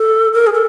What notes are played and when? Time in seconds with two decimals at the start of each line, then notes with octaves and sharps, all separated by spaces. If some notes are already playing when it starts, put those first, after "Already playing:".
Already playing: A4
0.33 A#4
0.47 G#4
0.53 A4